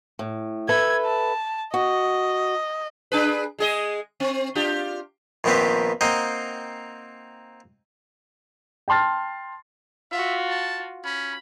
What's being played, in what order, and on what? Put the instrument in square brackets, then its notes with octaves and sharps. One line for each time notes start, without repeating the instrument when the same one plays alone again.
[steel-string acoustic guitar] A2
[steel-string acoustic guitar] A4 B4 E5 [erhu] G#6
[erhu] A5
[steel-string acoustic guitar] F#4 [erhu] D#5
[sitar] D4 G#4 B4
G#3 G#4 D#5
C4
D4 F4 G4
[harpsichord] A#1 D#3 B3 C4 G4 B4
A#3 C4 D#4 D#5 F#5 G5
[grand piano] G5 A5 C6 F6 A6
[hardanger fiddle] F4 F#4 [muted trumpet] E5
[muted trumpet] A5
[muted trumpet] C#4 [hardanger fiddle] B5